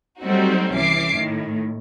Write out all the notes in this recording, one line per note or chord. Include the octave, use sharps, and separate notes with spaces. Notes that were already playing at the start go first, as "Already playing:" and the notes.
F#3 G3 A3 C4 D#4 F#4
C2 E3 C#4 E5 D6 C7
A2 D#3